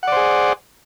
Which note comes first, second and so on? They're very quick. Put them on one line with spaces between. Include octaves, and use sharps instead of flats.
F#5 D5 C5 G#4